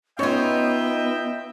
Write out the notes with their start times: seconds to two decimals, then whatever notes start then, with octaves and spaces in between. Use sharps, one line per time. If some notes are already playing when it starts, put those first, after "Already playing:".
0.19 B3 C#4 D#4 F4 C#5 D#5 E5 G5